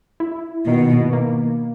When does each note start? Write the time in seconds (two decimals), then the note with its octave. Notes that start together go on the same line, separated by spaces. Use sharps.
0.20 E4
0.66 B2 D#3
1.13 A#3